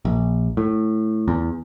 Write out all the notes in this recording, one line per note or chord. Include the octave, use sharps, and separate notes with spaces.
A#1
A2
E2